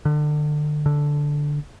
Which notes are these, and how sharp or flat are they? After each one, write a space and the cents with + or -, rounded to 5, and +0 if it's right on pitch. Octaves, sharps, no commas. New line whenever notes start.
D3 +30
D3 -5